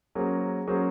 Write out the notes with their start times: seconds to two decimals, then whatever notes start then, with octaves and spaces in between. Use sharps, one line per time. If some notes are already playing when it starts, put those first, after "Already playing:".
0.15 F#3 A#3 C#4 G#4 C5
0.67 F#3 A#3 C#4 G#4 C5